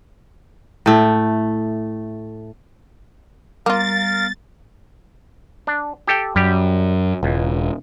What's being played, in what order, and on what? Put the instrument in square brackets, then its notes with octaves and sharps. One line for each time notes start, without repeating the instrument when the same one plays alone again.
[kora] A2 A3
[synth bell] G3 B3 [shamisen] A#3 F4 [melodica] A#4 F5 [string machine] A6
[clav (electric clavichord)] D4
G4 A4 G5
[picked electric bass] F#2 [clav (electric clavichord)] G3 G4
[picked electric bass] E1 [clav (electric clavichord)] C#2